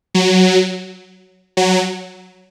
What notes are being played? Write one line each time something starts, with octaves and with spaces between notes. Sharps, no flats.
F#3
F#3